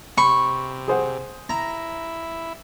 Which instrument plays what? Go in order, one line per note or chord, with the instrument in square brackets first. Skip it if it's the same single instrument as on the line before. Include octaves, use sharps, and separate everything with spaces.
[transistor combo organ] C3 [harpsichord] B5 [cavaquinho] C#6
[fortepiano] G#4 C5 F#5
[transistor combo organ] E4 [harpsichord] A#5